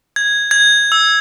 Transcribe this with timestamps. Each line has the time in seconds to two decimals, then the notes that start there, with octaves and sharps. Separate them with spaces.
0.16 G#6
0.51 G#6
0.92 E6